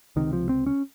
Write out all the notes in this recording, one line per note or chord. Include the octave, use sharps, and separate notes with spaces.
C#2 C3 D#3
F3
C4
C#4